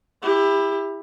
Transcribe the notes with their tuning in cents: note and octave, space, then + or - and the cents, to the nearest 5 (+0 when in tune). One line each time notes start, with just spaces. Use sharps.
E4 +0 G4 +30